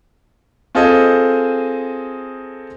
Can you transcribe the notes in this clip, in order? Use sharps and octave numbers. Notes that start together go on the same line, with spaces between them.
C4 F4 G#4 A4 C5 D#5